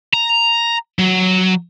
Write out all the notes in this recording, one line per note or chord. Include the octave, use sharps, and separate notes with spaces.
A#5
F#3